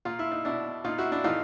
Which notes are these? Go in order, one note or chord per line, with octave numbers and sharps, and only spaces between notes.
A#2 F4
E4
D#4
B2 D4 E4
A#2 D#4 F4
E4 F#4
D4 E4
A2 E3 D#4 F4